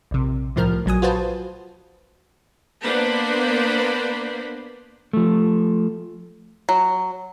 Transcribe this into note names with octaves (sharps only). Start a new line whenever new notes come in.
A#1 C3
C2 A2 F3 A#4 F6
A#1 F#3 G#5 D#6
F4 F#4 B4 C5 A5
A#3 B3 D4 C5 B5
F3 A3
F#3